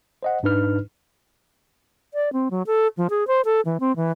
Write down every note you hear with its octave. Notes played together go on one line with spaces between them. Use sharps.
C5 D#5 F#5
G#2 D4 D#4 B4 F6
D5
C4
F#3
A4
F3
G#4
C5
A4
E3
C4
E3